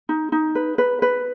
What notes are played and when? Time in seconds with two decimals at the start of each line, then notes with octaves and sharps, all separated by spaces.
0.09 D#4
0.32 D#4
0.55 B4
0.78 B4
1.02 B4